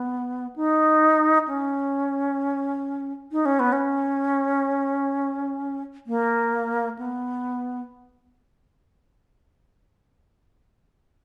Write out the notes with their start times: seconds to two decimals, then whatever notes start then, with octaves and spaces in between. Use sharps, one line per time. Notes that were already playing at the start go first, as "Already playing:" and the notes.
Already playing: B3
0.56 D#4
1.48 C#4
3.32 D#4
3.46 C#4
3.60 B3
3.73 C#4
6.07 A#3
6.99 B3